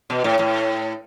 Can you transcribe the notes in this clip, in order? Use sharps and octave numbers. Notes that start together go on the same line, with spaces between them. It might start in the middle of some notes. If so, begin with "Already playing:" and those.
B2
A2
A2